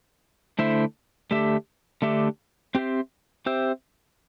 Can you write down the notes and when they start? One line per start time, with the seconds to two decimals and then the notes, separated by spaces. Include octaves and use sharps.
0.59 D3 A3 E4 C5 E5
1.31 D3 A3 D4 G4 E5
2.02 D3 A3 D4 G4 E5
2.75 C4 G4 C5 E5
3.46 C4 G4 C5 E5